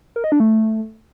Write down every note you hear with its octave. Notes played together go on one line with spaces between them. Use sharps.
A#4
D#5
D4
A3